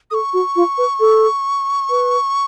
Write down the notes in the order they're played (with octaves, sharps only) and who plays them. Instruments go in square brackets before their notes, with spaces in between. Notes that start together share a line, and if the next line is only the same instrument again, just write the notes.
[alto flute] A4 [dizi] D#6
[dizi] C#6
[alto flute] F#4
F4
B4
A4
B4